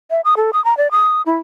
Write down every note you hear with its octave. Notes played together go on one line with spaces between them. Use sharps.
E5
D#6
A4
D#6
A#5
D5
D#6
E4